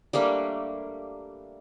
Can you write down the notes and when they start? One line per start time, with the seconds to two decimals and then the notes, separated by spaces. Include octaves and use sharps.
0.13 G3 A3 A#3 D4